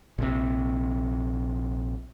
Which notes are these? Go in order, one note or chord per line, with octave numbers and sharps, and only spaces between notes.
A#1 C3